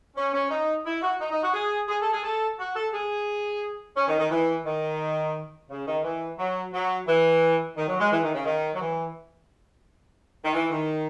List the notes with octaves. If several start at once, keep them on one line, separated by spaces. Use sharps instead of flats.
C#4
C#4
D#4
E4
F#4
D#4
D#4
F#4
G#4
G#4
A4
G#4
A4
F#4
A4
G#4
C#4
D#3
D#3
E3
D#3
C#3
D#3
E3
F#3
F#3
E3
D#3
F#3
G#3
E3
D#3
C#3
D#3
F#3
E3
D#3
E3
D#3